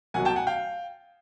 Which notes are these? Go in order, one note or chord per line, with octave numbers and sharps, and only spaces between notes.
C2 B2 F#3 F#5 G#5
G5 A5
F#5 G#5
F5 G5